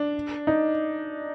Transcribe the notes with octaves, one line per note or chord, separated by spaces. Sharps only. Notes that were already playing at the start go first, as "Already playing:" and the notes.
Already playing: D4
D#4